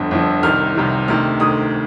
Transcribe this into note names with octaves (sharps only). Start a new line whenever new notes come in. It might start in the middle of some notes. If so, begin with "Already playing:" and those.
Already playing: G1 F2 D3
G1 F2 D3
C2 C3 D#3 F6
C2 C3 D#3
D2 C3 D#3 F6
D2 C3 D#3 D#6